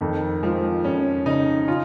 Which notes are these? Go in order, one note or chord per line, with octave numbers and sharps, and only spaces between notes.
F2 D#3
F3 G#3
F2 C#4
C#3 D#4
C#4 F4